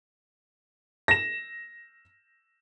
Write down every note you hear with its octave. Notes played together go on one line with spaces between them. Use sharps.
A#6 E7